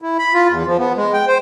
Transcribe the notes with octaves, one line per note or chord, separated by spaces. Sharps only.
E4
B5
F4
E2
F3
B3
G#3
G5
C5